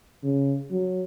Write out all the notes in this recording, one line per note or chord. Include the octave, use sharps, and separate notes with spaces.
C#3
F#3